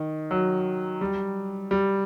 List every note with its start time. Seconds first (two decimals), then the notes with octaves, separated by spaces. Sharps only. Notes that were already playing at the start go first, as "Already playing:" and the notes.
Already playing: D#3
0.31 F#3
1.01 G3
1.71 G3